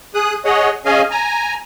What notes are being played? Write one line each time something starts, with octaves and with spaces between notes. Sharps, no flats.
G#4 D#6 F#6
G#4 C#5 D#5 F#5
C#4 G#4 D#5 F5 G#5
G#5 A#5